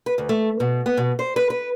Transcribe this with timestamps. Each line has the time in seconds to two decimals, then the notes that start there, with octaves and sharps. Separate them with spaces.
0.06 B4
0.18 D2
0.29 A3
0.60 B2
0.86 B3
0.97 B2
1.19 C5
1.36 B4
1.50 B4